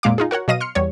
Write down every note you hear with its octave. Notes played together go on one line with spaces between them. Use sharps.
F2 A#2 G#3 F5 D6
D#4 F4 G#4
F#4 A#4 C#5 F#5
B2 F#3 D#5 F5 A#6 D#7
C6 F6 C#7
E2 G3 C#5